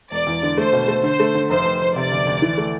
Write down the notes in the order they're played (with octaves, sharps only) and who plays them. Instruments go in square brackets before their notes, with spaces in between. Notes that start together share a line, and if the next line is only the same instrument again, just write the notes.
[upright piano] E1 [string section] D5
[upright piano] E2
D3
[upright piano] A3 [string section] C5
[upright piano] B2
A3
[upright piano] D3 [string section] C5
[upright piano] A3
D3
[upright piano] F1 [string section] C5
[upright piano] F1
F1
[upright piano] C3 [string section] D5
[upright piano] D2
D2
E3
A3